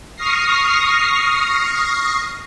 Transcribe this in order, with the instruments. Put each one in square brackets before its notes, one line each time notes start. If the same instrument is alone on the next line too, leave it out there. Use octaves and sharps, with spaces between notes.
[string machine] C#6 D#6 F6 A#6 C7